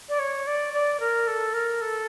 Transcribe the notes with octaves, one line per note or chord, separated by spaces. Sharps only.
D5
C#5
D5
D5
A#4
A4
A#4
A4